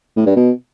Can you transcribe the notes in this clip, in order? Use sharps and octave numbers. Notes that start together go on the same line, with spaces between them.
A2
G2
B2